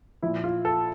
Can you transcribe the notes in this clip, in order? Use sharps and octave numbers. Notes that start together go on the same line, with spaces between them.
A#2 F3 E4
F4
A4